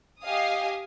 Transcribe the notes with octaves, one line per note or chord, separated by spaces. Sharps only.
G4 D#5 F5 G#5 D#6